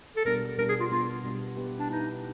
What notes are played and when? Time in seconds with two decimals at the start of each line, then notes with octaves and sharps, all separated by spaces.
0.16 A4
0.25 B2 G3 B3 D4 A#4
0.58 B2 G3 B3 D4 A#4
0.69 G#4
0.80 F4
0.91 B2 G3 B3 D4 F4
1.24 B2 G3 B3 D4
1.57 B3 E4 G4 B4
1.79 D4
1.90 B3 D#4 E4 G4 B4